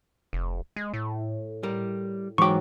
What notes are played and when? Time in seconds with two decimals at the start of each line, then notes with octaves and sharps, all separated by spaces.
0.33 F1
0.76 G#3
0.94 A2
1.63 G3 A#4
2.38 G#2 E3 F#3 G5 C#6 D6